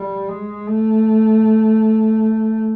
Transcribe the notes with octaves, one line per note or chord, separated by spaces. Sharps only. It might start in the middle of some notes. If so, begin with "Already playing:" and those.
Already playing: G3
G#3
A3